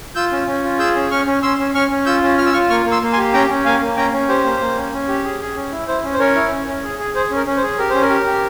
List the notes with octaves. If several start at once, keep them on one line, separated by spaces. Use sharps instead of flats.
F4 E6 G6
C#4
C#4
F4
G#4 E6 G6
C#4
C#4 C#6 F6
C#4
C#4 C6 E6
C#4
C#4 C#6 F6
C#4
F4 E6 G6
C#4
F4 F6
E6
F4 C#6 F6
A#3 C#6 F6
A#3
C6 E6
A#3
G#5 C6
G4
C#4 G5 A#5
C#4
A#3 F5 G#5
A#3
C#4 G5 A#5
C#4
G4 C5
A#3
A#3
C#4
C#4
G4
G#4
G#4
C#4
E4
E4 C5
C#4
C5
C#4 A#4 C#5
E4
C#4
C#4
G#4
G#4
G#4 C5
C#4
A#4
C#4
C5
G#4
G4 A#4
C#4 C5
A#4
G4
G4